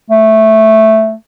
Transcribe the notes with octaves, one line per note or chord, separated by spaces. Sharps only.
A3